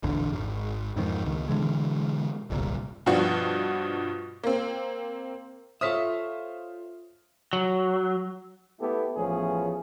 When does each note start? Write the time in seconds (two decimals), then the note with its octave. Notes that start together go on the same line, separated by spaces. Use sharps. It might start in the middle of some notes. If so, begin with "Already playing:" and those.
0.03 E1 A#1 E2 D3
0.33 G#1
0.96 F2 G#2 D#3
1.24 C#2 D#3
1.48 B2 D3 E3 G#3
2.50 D1 G1 C2 A#2
3.06 G2 B2 F3 D4 F#4
4.44 A#3 C4
5.81 F4 A4 C5 C#5 E5 D#6 F6 B6
7.53 F#3
8.80 A3 B3 E4 G4 A4
9.17 A1 F3 A3 B3 C#4 G#4